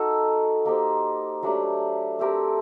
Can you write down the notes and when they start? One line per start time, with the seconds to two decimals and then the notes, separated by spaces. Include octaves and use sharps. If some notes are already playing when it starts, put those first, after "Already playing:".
Already playing: D#4 F#4 A4
0.65 A#3 D#4 G4 C5
1.43 F#3 A3 D4 G4
2.19 A3 C4 G4 A#4